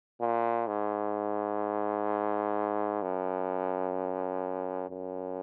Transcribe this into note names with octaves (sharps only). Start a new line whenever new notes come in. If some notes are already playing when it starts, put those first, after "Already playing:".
A#2
G#2
F#2
F#2